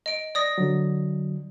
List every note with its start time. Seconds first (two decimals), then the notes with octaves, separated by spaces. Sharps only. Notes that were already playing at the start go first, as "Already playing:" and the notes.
0.06 D#5 D7
0.35 D5 D#6 A#6
0.58 D3 F#3